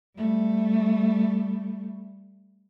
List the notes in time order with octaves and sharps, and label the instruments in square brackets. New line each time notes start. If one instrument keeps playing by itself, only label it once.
[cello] G3 A3